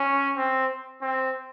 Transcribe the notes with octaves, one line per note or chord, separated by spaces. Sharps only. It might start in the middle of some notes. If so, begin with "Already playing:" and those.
Already playing: C#4
C4
C4